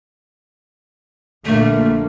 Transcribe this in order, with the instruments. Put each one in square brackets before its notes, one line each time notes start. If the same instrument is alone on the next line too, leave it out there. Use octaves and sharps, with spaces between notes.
[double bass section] A#1 D3 A#3 [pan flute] A3